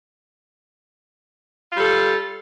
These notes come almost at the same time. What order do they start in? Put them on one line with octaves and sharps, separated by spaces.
F4 G3 A4